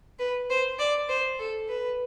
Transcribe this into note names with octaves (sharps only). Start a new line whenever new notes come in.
B4
C5
D5
C5
A4
B4